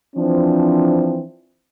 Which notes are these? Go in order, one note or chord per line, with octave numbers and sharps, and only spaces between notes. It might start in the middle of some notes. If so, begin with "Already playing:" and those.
E3 F3 C4 D4